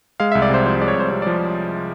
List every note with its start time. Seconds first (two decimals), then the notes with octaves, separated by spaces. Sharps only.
0.20 G#3 F5
0.32 C2 E5
0.42 D5
0.50 C3 C5
0.65 F3 C5
0.80 G#3 D5
0.88 C#5
0.96 C2 C5
1.11 C3 C#5
1.22 F3 D5